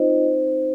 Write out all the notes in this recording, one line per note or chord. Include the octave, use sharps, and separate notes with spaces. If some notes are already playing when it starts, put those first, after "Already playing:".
Already playing: C4 D#4 F4 C5 D#5
D#4